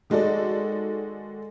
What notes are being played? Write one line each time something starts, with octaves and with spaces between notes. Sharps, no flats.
D#3 G#3 F#4 A4 D5